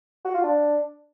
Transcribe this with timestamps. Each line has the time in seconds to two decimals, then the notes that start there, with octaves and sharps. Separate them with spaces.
0.25 F#4
0.34 F4
0.44 D4